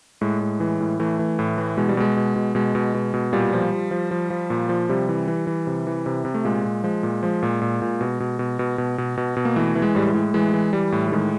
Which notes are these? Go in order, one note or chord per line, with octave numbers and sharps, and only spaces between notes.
A2 G#3
A2
E3
A2
E3 A3
E3
A2
E3
B2 G#3
G3
B2 G#3
B2
B2
B2 G#3
B2
B2
B2
A#2 G3
F3
F3
F3
F3
F3
A#2
F3
C3 G3
E3
E3
E3
C3
E3
C3
C3
A3
A#2 G#3
A#2
F3 G#3
A#2
F3 G#3
A#2
A#2
A#2
B2
B2
B2
B2
B2
B2
B2
B2
A#3
E3 A3
E3
G#3
A2 G3
G#3
A2
E3 G#3
E3
E3 G3
A2
G3
D#3 G#3